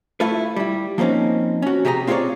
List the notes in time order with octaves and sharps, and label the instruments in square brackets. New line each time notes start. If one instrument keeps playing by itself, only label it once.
[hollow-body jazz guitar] A3 E4 F4 A4 B4
G3 E4
F3 A#3 C4 C#4 D#4
C#4 F#4
C3 G4 G#4 B4 A#5
C4 F4 G#4 B4 C#5 D5